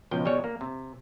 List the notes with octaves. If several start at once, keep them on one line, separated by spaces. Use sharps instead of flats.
C#2 B2 F3 G5
B2 G3 G#3 C#5
A#3
C3